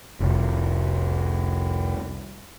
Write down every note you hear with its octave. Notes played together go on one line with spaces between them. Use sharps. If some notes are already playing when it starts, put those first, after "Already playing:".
F1 C2